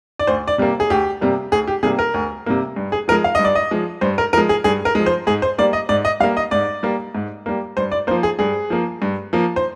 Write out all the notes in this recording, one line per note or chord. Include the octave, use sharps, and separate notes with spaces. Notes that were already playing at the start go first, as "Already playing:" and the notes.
D5
D2 C5
D5
C3 G3 A#3
G#4
D2 G4
C3 G3 A#3
D2 G#4
G4
C3 G3 A#3 G#4
A#4
D2
C3 G3 A#3
G2
G#4
F3 G#3 A#4
F5
G2 D#5
D5
D#5
F3 G#3
G2 C5
A#4
F3 G#3 A#4
G#4
G2 G#4
A#4
F3 G#3
C5
G#2 G#4
C5
G3 A#3 D5
D#5
G#2 D5
D#5
G3 A#3 F5
D#5
G#2 D5
G3 A#3
G#2
G3 A#3
G2 C5
D5
F3 A#3 C5
G#4
G2 G#4
F3 A#3
G2
F3 A#3
C5